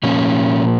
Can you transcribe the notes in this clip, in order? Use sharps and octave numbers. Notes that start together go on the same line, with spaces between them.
A#2 F3 A#3 C#4